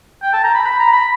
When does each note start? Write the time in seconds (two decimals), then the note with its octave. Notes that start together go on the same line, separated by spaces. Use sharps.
0.22 G5
0.33 A5
0.44 A#5
0.54 B5
0.65 B5
0.79 A#5
0.93 B5